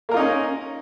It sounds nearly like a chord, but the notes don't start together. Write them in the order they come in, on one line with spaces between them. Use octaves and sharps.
A#3 A#4 F4 D#4 C#4